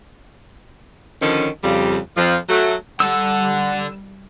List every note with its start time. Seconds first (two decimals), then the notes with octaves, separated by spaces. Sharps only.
1.22 D3 D#3 F3 C#4
1.64 F2 C#3 G3
2.17 F2 F3
2.49 F#3 A3
3.00 D3 G3 A4 F#5 E6